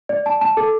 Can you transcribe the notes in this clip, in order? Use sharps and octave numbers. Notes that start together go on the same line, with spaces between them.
D5
A5
A5
A4